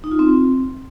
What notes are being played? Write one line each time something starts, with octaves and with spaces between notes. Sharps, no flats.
D#4
F4
C4